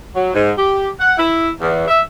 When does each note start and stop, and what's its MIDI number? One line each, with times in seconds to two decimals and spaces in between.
0.15 0.31 54
0.34 0.51 44
0.56 0.90 67
1.00 1.16 78
1.18 1.49 64
1.60 1.86 40
1.88 2.01 76